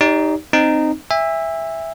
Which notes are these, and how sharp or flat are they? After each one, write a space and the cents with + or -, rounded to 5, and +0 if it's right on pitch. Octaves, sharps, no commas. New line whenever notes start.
D#4 +0 G4 +0 D5 -45
C4 +0 D#4 -15
E5 +0 G#5 -40